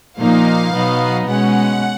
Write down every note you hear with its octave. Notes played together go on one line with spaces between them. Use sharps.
A#2 F3 A#3 D#4 F5
B2 F#3 B3 D#4
B2 G#3 C#4 F#5